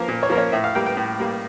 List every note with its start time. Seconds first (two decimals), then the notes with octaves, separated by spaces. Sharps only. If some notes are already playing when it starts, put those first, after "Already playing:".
Already playing: F3 A#3 A#4
0.08 A#2
0.23 C#5
0.30 F3 A#4
0.35 A#3 C#5
0.52 A2 E5
0.64 F5
0.75 G3 A#3 G5
0.86 G5
0.97 A2
1.20 G3 A#3